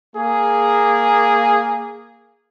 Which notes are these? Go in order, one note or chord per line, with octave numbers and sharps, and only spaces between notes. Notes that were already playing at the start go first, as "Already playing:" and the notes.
A#3 G#4